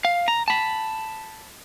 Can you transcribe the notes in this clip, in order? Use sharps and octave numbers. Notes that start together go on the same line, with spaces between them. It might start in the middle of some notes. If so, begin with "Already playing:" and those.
F5
A#5
A5 B5